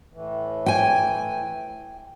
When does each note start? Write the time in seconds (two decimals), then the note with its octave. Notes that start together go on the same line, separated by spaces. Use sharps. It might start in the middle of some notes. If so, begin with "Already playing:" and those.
0.13 A2 E3
0.66 G5 G#5